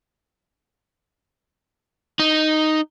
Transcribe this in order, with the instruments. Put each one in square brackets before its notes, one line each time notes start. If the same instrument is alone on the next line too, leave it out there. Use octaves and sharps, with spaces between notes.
[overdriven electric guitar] D#4